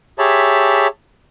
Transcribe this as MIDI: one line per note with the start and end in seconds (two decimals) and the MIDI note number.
0.19 0.87 67
0.19 0.87 68
0.19 0.87 73
0.19 0.87 76
0.19 0.87 81
0.19 0.87 83